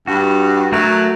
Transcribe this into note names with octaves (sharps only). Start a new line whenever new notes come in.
G2 F#4
F#3 A3 F#4 A#4